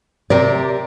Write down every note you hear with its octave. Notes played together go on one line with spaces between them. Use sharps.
C3 G4 A#4 D5